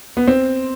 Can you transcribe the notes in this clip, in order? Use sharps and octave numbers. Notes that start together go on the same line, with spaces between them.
B3
C4